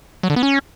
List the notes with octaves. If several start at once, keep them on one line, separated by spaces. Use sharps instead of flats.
F#3
D3
B3
C#4